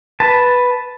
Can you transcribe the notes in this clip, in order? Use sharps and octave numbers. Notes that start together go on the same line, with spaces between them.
B4 A5